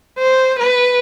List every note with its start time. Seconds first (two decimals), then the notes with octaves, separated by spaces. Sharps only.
0.19 C5
0.59 B4